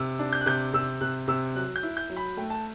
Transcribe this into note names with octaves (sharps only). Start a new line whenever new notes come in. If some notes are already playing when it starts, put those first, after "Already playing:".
Already playing: C3 E6
D4
G6
F#6
C3 G6
C3 E6
C3 F#6
C3 E6
F#3 F#6
G6
E4
G6
F#3
B5
A3 G5
A5